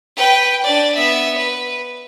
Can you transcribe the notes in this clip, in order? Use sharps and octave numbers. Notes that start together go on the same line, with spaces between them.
B4 G5
D4 D5
B3 E5
B4